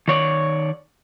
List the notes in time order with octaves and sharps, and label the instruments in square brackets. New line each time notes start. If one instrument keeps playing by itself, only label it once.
[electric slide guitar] D#3 C#5 D5